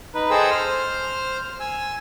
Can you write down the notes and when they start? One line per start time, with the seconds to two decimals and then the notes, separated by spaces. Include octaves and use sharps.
0.15 D#4 B4
0.30 G#4 A4 C5 D#5 G5 E6
0.51 C5 F6
1.60 G#5 E6